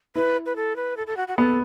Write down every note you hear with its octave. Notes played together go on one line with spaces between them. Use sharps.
E4 B4
B4
A4
B4
A4
A4
F#4
F#4
B3 A4